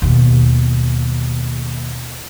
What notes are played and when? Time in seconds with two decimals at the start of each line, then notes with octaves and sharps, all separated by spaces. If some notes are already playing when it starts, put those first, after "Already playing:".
0.02 D#2 B2